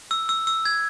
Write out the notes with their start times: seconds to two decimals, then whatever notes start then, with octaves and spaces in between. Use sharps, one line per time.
0.11 E6
0.29 E6
0.47 E6
0.65 G#6